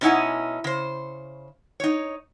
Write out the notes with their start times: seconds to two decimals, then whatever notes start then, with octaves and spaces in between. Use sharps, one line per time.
0.01 B2 C#4 D#4 E4 F#5 G#5
0.64 C#3 C5
1.80 D#4 C#5